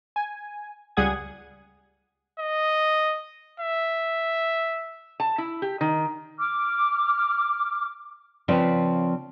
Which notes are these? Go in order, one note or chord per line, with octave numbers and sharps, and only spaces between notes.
G#5
C#2 G3 G#4 F#5 D#6 G#6
D#5
E5
A5
E4
G4
D#3
D6 F6
C#3 F3 C4 B4 D5